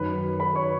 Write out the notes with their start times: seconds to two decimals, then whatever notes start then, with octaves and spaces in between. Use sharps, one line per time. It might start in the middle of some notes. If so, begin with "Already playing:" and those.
Already playing: F#2 D#3 F#3 B4 B5
0.40 B4 B5
0.55 C#5 C#6